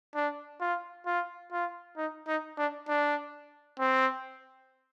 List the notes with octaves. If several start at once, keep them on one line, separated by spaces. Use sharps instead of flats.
D4
F4
F4
F4
D#4
D#4
D4
D4
C4